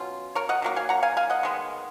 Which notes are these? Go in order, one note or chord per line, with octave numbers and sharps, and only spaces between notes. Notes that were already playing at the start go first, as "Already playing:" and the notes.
Already playing: B2 F#3 C#4 F4
A#4 C#5
D#5 F#5
D#3 F#3 A#3
F5 G#5
F#5 A#5
F5 G#5
F5 G#5
D#5 F#5
D#3 G#3 B3